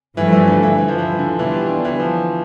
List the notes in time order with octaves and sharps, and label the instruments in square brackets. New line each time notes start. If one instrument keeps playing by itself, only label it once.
[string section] G2 F3 A3 [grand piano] E3
[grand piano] E3
D3
E3
E3
F3
E3
D3
[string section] B2 G3 D4 F4 [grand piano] E3
[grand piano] D3
E3
F3